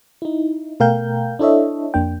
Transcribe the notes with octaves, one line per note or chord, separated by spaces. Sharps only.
D#4 E4
B2 A3 A#4 F5 G5 G6
D4 E4 A4 C#5 D#5 E5
F2 A#3 D4 G5